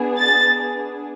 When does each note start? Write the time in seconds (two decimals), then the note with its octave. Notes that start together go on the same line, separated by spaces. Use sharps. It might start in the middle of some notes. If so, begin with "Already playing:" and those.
Already playing: B3 D4 G#4
0.16 A6